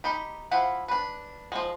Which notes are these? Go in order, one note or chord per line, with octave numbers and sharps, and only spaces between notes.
D#4 G4 B5
F3 E4 F5 F#5 B5
D4 B4
F3 G#3